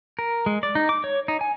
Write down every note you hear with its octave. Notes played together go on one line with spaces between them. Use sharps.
A#4
G#3
D5
D#4
D6
C#5
D#4
G#5